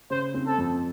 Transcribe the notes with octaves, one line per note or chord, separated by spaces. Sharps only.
C#3 C5
C4
A4
F2